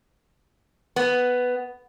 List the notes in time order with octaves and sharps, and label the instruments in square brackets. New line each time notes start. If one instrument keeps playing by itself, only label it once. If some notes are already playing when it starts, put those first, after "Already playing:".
[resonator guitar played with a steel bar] B3